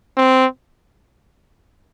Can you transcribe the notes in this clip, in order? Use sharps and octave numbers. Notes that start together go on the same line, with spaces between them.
C4